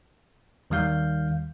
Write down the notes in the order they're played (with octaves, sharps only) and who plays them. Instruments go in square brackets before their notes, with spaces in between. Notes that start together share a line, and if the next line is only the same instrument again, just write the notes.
[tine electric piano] D#2 D#3 G3 F5 G6